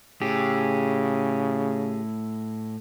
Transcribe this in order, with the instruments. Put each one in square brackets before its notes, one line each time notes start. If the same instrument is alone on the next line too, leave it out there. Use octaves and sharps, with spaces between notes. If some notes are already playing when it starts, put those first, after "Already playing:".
[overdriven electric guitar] A2 [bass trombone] C#3 [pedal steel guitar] G4 G#4